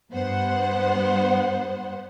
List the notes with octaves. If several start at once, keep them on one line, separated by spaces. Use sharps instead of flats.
G2 B3 C5 F#5